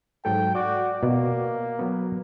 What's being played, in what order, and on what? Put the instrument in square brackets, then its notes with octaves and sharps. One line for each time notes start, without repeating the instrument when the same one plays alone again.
[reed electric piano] G#2 F#3 A4 [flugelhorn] G5
[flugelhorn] F#4 [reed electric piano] D5 D6
[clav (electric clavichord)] B2 [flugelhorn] A#3
[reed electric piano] F#3 B3